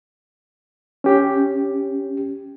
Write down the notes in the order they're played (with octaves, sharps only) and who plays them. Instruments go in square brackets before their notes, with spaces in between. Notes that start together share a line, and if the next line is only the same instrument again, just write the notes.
[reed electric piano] C#4 G4